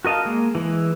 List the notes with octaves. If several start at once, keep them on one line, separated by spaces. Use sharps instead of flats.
F#4 A#4 D#5 F5 A5
G#3 A#3
E3 G#3